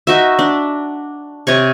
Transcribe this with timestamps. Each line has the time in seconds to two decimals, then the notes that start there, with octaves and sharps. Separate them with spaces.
0.07 D#4 F#4 E5
0.39 D4
1.47 C3 C#5 C#6